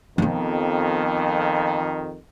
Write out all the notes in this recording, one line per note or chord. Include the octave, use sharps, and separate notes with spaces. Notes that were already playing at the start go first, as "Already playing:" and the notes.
F2 D#3 F3 B3